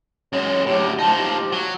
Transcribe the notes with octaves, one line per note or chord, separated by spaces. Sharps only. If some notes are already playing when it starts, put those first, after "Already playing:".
F#2 G#3 C#5
D2 A2 G4
F3 D#4 A5
G4
F#3